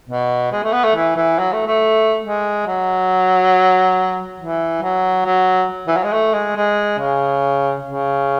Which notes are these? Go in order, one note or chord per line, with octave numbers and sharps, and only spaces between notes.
B2
G#3
A3
B3
A3
E3
E3
F#3
A3
A3
G#3
F#3
E3
F#3
F#3
E3
F#3
G#3
A3
G#3
G#3
C#3
C#3